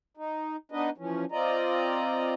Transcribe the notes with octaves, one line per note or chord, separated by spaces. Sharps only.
D#4
B3 D4 D#4 B4 D#5
E3 F3 C#4
C4 F4 D5 D#5 A#5